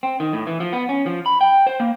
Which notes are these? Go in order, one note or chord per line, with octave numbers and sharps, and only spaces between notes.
C4
D#3
A2
E3
F3
B3
C#4
F3
B5
G5
C5
A#3